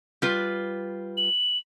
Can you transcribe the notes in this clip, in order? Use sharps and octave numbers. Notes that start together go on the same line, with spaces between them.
G3 F4 B4
F#7